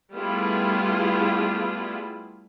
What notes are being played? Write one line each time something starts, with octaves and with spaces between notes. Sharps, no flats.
G3 A3 B3 E4 F4 G#4